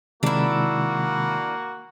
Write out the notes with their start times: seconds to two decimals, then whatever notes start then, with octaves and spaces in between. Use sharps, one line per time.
0.23 C3 D#3 G#3 A#3 D4 E4 F#4